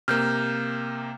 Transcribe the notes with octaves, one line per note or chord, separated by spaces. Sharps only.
C3 A#3 F6 G6